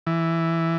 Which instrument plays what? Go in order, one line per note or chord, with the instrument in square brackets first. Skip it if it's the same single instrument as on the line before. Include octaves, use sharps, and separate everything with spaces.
[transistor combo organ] E3